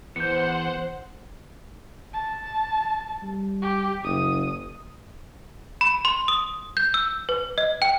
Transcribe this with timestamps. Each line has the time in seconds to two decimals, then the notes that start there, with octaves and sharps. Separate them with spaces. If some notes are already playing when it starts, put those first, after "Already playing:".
0.16 E3 B3 C5 F#5 G6 C#7
2.13 A5
3.23 G3
3.62 G4
4.04 F#1 D#6
5.81 B5
6.05 C6
6.28 D#6
6.77 G6
6.94 E6
7.29 B4
7.58 D#5
7.82 G5